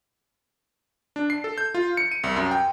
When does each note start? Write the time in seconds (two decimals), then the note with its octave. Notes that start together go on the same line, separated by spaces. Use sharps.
1.16 D4
1.30 C7
1.44 A4
1.58 G6
1.74 F4
1.97 C#7
2.12 D#7
2.24 C2
2.36 F#2
2.51 G5